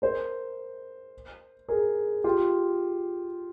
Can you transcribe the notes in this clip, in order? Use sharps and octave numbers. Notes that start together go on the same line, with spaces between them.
A#4 C5
G#4 A#4
F4 G4